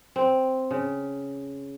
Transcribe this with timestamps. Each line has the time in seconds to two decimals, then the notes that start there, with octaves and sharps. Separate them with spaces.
0.16 C4
0.71 C#3